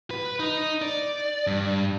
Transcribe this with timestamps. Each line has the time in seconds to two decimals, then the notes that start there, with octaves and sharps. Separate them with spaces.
0.11 B4
0.40 D#4
0.82 D5
1.47 G2